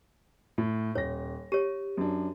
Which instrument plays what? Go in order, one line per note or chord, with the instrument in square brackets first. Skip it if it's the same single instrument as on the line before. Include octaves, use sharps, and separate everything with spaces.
[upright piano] A2
[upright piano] D#1 A#6 [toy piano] C#5
[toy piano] G4 C#5 [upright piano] D#7
[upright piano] F#2 D4